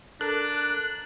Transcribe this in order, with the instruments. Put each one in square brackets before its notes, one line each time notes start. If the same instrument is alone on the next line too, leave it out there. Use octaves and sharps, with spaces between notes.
[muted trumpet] D4 [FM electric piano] A4 A#4 A#5 [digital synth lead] F#6